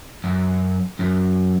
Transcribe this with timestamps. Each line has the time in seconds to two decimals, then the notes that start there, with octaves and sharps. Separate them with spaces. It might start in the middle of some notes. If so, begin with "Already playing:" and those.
0.24 F#2
0.99 F#2